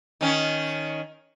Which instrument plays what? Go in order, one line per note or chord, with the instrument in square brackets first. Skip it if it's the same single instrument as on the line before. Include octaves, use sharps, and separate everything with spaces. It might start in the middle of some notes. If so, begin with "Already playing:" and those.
[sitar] D#3 C#4